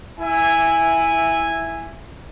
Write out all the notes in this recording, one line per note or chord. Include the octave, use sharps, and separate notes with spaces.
E4 E5 G#5